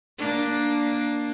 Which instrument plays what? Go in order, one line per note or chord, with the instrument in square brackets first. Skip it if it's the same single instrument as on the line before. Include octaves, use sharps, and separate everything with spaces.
[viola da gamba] A#3 D4